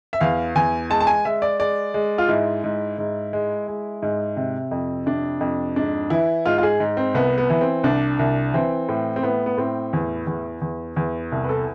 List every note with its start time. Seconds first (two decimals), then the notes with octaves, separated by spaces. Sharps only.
0.13 E5
0.21 E2 F5
0.55 E2 G#5
0.90 G#3 A5
1.00 A5
1.07 G#5
1.25 G#3 E5
1.42 D5
1.59 G#3 D5
1.94 G#3
2.18 F4
2.28 G#2 E4
2.64 G#2
2.98 G#2
3.33 G#3
3.68 G#3
4.02 G#2
4.36 C3
4.71 F2
5.06 C3 D4
5.41 F2
5.76 G#2 D4
6.10 E3 E4
6.46 G#2 F4
6.58 F4
6.63 G#4
6.80 G#2
6.97 C4
7.14 C2 B3
7.38 B3
7.50 E3
7.61 C4
7.84 C2 D4
8.19 C2
8.54 E3 C4
8.89 A2
9.16 C4
9.23 A2 B3
9.46 B3
9.57 A2 C4
9.93 E2
10.27 E2
10.61 E2
10.96 E2
11.32 C2
11.44 B4
11.49 A4